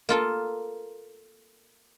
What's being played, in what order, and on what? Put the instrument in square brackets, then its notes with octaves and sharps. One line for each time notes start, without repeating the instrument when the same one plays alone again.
[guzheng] A#3 F4 A4